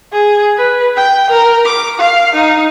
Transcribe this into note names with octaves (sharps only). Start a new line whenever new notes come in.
G#4
B4
G5
A#4
D6
F5
D#4